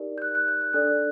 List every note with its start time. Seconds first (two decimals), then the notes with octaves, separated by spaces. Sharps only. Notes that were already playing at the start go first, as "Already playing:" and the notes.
Already playing: D#4 G4 A#4 D5
0.18 G6
0.22 F#6
0.35 F#6
0.48 G6
0.61 F#6
0.73 D4 A4 D5 F#6